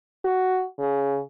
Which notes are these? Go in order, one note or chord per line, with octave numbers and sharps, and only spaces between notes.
F#4
C#3